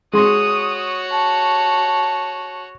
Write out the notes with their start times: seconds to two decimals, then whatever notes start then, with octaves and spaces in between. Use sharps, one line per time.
0.13 G#3 F#4 C#5 C6 D#6
1.12 A5